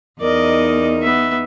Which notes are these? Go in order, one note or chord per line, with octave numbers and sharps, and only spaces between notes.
E2 D#4 A#4 D5 D#5
B3 E5